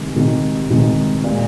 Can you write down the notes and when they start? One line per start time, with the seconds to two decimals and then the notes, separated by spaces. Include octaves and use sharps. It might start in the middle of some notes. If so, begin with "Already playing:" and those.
Already playing: C3 D#3 G#3
0.15 C3 D#3 G#3
0.70 C3 D#3 G#3
1.24 A#2 G#3